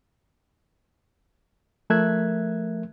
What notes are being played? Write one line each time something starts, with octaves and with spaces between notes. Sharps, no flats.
F3 A3 A#4 E5 F#6 G#6